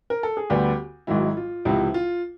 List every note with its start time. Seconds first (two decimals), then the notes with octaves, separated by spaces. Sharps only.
0.10 A#4
0.23 A4
0.37 G#4
0.50 D2 D3 G3 B3 G4
1.07 G#1 G#2 D#3 F#3 E4
1.37 F4
1.65 C#2 C3 F3 E4
1.94 F4